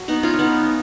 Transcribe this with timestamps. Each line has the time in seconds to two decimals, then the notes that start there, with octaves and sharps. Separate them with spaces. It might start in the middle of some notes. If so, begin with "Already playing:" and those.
Already playing: F#3
0.08 B3 D#4
0.23 C#4 F4
0.33 C#4
0.39 B3 D#4